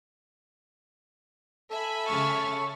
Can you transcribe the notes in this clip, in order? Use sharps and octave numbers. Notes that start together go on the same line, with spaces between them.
A4 E5 G#5 B5
C#3 C#6 F6 A6